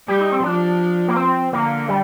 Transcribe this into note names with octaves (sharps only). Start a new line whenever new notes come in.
G3 G4
D#4
C4
F3 D4
A#3
C4
D3 A#3
G3